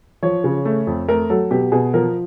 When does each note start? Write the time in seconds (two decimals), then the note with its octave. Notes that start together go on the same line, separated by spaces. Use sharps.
0.23 F3 C#5
0.44 C#3
0.65 A3
0.87 F2
1.09 A3 A#4
1.30 F#3 A4
1.51 B2 G4
1.72 B2 G#4
1.94 F3 A#4